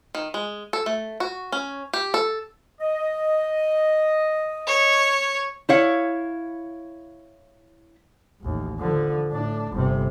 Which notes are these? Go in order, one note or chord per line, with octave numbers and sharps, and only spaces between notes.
D#3
G#3
A4
A3
F#4
C#4
G4
A4
D#5
C#5
E4 C#5 F5
A1 D#2
D3 F3
A2 D4
G1 C3